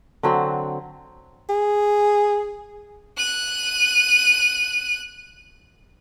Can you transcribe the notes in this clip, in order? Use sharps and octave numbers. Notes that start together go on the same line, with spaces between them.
D3 F#3 C4
G#4
F#6 D#7